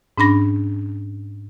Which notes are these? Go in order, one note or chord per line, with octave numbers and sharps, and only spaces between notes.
G#2 C#4 D4 B5 A#6